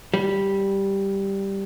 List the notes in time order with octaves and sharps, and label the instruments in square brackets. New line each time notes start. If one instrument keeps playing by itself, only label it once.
[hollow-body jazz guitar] G3